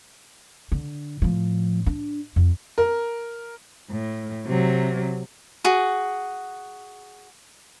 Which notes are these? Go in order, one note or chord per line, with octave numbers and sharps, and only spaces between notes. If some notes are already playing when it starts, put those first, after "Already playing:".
D3
A2 F3
D4
F2
A#4
A2
C3 F#3
F#4 G#4